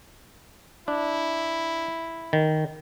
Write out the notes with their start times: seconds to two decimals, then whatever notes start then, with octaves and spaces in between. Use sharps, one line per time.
0.88 D4 E4
2.33 D#3